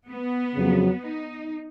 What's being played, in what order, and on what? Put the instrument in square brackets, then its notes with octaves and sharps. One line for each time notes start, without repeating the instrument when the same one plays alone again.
[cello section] B3
[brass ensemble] F2 C#3 F#3
[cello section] D#4